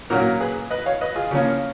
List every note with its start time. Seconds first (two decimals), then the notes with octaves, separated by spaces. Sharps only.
0.10 A#2 F#3 A#3 C#4 F#4 A#4
0.41 G#4 B4
0.70 B4 D#5
0.86 C#5 F5
1.01 B4 D#5
1.16 F4 G#4
1.31 C#3 F3 A#3 C#4